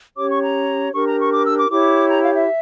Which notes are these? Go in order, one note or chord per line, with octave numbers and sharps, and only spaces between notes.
C#4 G4 C#5 D6
C#6
A#5
D4 G4 A#4 C#6
A#5
C#6
D6
E6
D6
E4 G4 C#5 D6
A#5
F5
E5